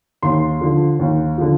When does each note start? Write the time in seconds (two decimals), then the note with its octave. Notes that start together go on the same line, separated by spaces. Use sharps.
0.23 D#2 C6
0.61 D3 F3
0.99 D#2
1.38 D3 F3